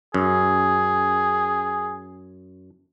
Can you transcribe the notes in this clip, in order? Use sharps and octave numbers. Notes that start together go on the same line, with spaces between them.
F#2 G#4